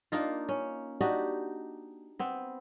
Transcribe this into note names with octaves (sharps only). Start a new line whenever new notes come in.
A#3 D4 D#4 F4
C#4
D4 D#4 F#4 G4
B3 C4